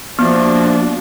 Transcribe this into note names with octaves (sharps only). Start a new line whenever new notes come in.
F3 A#3 B3 D4 F#4